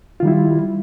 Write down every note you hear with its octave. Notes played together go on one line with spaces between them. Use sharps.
D#3 G3 E4 F4